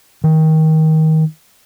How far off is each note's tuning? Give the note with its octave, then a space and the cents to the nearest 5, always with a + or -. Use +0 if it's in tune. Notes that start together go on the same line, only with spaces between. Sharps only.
D#3 +25